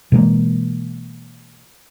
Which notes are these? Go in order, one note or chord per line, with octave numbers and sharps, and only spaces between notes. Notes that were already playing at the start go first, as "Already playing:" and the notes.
B2 E3 G#3 A#3